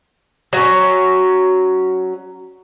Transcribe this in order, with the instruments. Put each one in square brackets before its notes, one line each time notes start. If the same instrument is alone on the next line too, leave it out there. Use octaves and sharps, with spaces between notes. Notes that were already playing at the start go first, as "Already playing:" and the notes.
[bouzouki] F#3 C#4